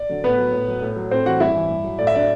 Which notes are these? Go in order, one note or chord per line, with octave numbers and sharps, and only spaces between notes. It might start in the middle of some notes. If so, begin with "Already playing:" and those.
Already playing: D5
D3 F#3
A2 B3 B4
F#3
A2
F#3
A2
F#3
A2 C4 C5
E3 F#4 F#5
G2 E4 E5
E3
G2
F#3
A2 D5
E5
F#3 D4 D5